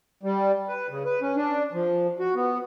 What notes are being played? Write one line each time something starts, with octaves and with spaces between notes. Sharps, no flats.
G3
B4
C#3
B4
C#4
D4
F3
F#4
B3